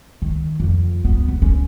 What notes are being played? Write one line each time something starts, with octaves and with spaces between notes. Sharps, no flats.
D#3
F2
B3
D#1
C#4